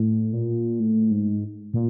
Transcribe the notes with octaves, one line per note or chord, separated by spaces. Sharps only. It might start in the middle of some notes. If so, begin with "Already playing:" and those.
Already playing: A2
A#2
A2
G#2
A#2